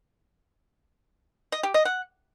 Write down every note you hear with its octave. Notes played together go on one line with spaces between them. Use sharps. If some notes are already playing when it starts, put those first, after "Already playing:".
D#5
G4
D#5
F#5